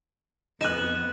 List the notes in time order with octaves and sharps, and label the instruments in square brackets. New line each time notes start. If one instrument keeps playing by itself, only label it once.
[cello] F2 B3 [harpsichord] D#4 G#5 [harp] F#6 E7